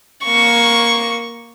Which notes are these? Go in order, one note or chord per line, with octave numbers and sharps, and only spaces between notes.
A#3 C#6